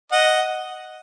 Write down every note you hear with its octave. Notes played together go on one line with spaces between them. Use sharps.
D#5 F#5